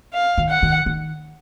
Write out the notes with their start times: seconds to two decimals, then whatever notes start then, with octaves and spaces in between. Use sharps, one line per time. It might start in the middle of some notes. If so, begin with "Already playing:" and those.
0.14 F5
0.38 D#3
0.50 F#5
0.62 D#3
0.86 D#3